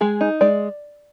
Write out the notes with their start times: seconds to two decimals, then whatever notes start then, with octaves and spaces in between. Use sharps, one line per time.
0.01 G#3 G#4
0.21 D#4
0.41 G#3 D5